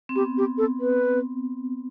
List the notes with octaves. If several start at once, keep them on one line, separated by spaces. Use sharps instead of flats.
C4
B3 G4
G4
A4
B4